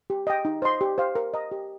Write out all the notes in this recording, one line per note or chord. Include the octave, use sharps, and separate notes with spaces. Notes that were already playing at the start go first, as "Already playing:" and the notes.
G4
D#5 G5
D#4
C5 D#5 C6
G4
C5 F5
A#4
D#5 A#5
G4